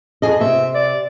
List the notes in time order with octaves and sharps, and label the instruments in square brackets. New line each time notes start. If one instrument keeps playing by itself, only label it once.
[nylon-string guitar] F2 G#4 D#5
[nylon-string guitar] C3 C4 [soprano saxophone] E5
[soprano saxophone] D5